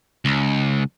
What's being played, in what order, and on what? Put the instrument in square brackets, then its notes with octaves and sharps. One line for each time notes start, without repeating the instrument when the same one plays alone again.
[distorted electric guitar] C#2